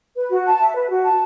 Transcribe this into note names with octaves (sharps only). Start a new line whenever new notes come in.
B4
F#4
A5
E5
B4
F#4
A5